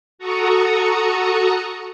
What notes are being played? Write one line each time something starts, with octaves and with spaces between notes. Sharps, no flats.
F#4 A4 A#5 C#6 D#6 C#7